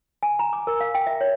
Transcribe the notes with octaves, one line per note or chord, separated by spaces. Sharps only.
G#5
A#5
D6
A#4
F5
G5
E5
C#5